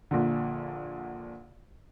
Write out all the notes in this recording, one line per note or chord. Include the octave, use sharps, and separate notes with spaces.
A#1 A#2 D3